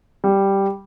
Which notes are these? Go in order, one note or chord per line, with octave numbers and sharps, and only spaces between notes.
G3